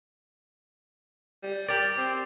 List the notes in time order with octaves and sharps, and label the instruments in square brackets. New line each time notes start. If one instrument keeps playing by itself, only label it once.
[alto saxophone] G3
[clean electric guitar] G4 D5 [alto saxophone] A#4
[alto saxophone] C4